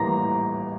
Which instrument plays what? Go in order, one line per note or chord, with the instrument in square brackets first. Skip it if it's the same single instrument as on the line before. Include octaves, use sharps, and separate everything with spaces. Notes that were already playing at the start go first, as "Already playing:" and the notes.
Already playing: [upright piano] A2 E3 G3 A#3 A#5 A#6